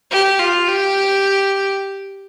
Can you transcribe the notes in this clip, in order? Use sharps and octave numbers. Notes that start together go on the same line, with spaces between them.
G4
F4
G4